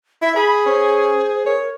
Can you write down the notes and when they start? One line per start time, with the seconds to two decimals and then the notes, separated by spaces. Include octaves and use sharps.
0.22 E4 E5
0.36 G#4 B5
0.66 C#4 C5
1.46 A#4 C#5